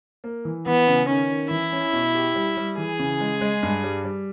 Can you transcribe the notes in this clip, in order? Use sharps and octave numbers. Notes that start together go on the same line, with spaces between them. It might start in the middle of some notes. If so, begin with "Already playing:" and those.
A#3
E3
E3 B3
C#3
D#3 C#4
D#3
E3 E4
C#4
B2
G4
G3
G3
E3 G#4
C#3
G#3
G#3
G2
G3
G3